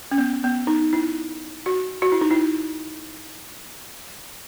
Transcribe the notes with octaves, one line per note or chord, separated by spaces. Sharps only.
C#4
B3
B3
D#4
E4
F#4
F#4
E4
D#4
E4